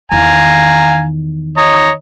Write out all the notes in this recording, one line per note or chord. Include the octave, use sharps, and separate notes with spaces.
E2 D#3 F5 G#5 A#5
C#5 D#5 A#5